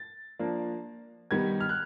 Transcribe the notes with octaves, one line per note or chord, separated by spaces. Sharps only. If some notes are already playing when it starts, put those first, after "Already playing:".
Already playing: A6
F3 A#3 D4
D#3 G3 B3 G#6
F6
F#6